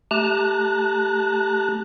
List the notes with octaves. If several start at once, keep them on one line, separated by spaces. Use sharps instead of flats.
A3 G4 A5 A#5 F#6